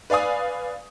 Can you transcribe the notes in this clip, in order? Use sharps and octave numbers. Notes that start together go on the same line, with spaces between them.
B4 D5 F5 G#5 D#6